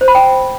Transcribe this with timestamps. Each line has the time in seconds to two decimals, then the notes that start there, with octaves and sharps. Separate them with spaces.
0.01 C5
0.08 B5
0.15 G5